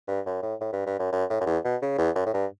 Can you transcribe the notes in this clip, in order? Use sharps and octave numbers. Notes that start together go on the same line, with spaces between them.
G2
F#2
A2
A2
G2
G2
F#2
F#2
A2
F#2
E2
B2
C#3
E2
F#2
A2
G2